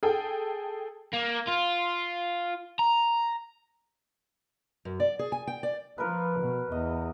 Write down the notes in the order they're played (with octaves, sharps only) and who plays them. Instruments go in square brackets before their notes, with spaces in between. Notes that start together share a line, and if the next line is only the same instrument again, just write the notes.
[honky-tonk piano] G#4 A4 G5
[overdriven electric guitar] A#3
F4
A#5
[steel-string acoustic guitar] F#2
D5
G#4
G#5
G5
D5
[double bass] F3 [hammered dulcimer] A#4 B4
[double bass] B2
[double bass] E2 [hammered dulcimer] D#5